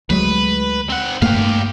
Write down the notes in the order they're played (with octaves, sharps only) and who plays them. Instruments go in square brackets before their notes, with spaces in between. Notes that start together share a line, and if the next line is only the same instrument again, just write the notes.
[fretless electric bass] D2 F#3 G#3 [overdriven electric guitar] B4
[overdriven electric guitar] C4 F#5
[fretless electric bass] G2 A3 A#3 [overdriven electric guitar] G4 F5